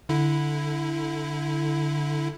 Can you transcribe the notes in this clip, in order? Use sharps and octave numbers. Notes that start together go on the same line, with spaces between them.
D3 E4